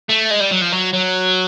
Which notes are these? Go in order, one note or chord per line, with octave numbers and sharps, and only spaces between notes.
A3
G#3
G3
F#3
F3
F#3
F#3